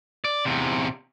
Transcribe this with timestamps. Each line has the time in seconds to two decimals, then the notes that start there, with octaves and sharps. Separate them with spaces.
0.24 D5
0.45 E2 C3